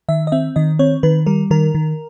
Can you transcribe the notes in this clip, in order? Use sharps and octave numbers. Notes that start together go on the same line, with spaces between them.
D#3 E5
D#5
C4 E5
D#3 D#5
C4 C#5
D#3 B4
G3 A#4
D#3 A#4
D#3